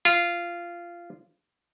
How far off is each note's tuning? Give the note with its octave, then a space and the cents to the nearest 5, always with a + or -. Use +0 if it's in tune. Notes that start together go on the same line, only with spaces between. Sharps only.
F4 -15